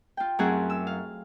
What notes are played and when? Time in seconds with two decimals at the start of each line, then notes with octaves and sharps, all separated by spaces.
0.17 F4 G5
0.39 F#2 A3 C4 E4 G#4 F#5
0.70 E6
0.87 F5